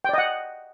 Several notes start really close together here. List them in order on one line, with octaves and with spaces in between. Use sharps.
G5 D5 D#5 F#5